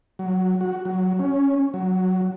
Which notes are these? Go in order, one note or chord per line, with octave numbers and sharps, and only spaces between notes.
F#3
F#4
F#3
C#4
F#3